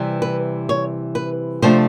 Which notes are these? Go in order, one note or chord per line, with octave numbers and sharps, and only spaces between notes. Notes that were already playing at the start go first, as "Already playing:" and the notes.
Already playing: C3 E3 G3
B4
C#5
B4
C3 F3 A3 D4 C5